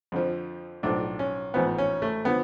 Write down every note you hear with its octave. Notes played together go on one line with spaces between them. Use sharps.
F2 D3 F3
B1 A2 F3 D4
C#4
A1 G#2 F3 B3
C#4
A3
D3 F3 B3